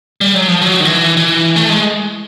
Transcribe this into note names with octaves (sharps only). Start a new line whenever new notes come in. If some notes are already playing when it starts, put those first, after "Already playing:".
G3
F#3
F3
F#3
D#3
E3
E3
A3
G#3